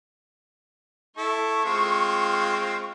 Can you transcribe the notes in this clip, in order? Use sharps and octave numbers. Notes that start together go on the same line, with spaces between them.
E4 A4 C#6
G#3 C4 F4